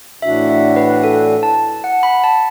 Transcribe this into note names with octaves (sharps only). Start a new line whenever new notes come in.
A2 E3 D4 F#4 E5
E5
B4
A4
A5
F#5
B5
A5